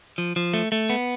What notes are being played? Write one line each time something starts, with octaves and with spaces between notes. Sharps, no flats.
F3
F3
A3
A3
B3